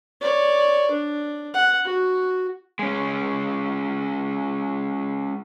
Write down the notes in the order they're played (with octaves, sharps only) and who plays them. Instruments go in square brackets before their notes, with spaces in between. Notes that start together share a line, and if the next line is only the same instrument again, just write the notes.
[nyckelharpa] C#5 D5
D4
F#5
F#4
[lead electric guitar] G#3 C#4